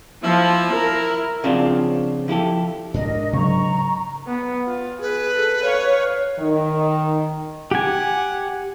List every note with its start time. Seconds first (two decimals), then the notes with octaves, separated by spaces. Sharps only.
0.24 F3 E4
0.73 A#4
1.44 C#3 F3 C4 D4 F4 F#4
2.28 F3 E4 G4 A4
2.94 G#2 D4 A#4 D#5
3.33 C#3 F#3 A#5 C#6
4.27 B3
4.67 F4
5.02 G#4 B4
5.35 A4
5.64 C#5 F5
6.39 D#3
7.71 G4 F#5 G#5